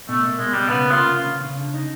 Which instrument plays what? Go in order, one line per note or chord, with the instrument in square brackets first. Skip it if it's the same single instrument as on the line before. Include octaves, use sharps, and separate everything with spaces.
[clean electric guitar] B2 [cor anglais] A3
[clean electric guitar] A#3
[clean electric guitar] B2 [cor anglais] G#3
[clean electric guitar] B2 [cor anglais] G3
[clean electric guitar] C#3 [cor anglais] B3
[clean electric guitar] A#3
[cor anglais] F4
[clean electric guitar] C#3
C#3
C#3
C#3
D3
D#4